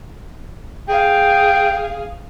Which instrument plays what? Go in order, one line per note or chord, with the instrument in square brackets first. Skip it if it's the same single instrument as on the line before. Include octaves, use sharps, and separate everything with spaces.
[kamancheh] G#4 F5 [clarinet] G5